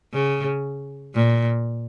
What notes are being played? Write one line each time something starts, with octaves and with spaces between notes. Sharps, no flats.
C#3
A#2